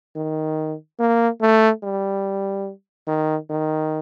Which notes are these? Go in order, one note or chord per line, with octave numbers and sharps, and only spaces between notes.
D#3
A#3
A3
G3
D#3
D#3